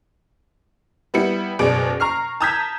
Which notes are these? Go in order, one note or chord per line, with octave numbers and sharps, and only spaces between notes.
G3 B3 E4 C#7
F#1 B2 G#4 D5 D7
A#5 C#6 F6 C7
A5 A#5 D#6 G6 G#6 B6